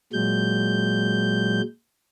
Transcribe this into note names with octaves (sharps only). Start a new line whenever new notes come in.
A#2 F#3 G#3 G6